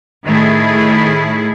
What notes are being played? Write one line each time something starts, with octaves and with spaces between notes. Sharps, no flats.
A2 D#3 A3 E4 G#4